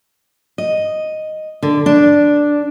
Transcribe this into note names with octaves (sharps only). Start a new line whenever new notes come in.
D#5
D3
D4